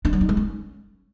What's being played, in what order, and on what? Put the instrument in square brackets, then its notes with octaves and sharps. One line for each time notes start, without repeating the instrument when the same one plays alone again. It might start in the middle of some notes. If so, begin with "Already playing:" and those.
[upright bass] D4
F#3
D#4
G#3
C#4